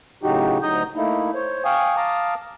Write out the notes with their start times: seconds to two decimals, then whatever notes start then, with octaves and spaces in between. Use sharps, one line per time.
0.23 A2 C#3 F#3 D#4 F#4 G4
0.63 D2 F#3 D#4 A#5 D#6 G6
0.96 A3 A#3 D#4 E4
1.34 C5 C#5
1.65 F5 G5 G#5 C#6 D#6
1.96 F5 A5 A#5 D6 D#6